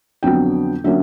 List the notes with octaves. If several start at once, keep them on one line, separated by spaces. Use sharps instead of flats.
F2 D3 F#3 B3 G5
D3 F#3 A#3 C#4 E5